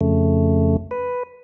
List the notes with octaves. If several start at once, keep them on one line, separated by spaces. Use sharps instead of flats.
F2 C#3 A3
B4